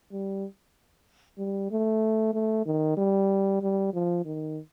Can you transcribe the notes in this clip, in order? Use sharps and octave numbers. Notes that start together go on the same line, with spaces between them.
G3
G3
A3
A3
D#3
G3
G3
F3
D#3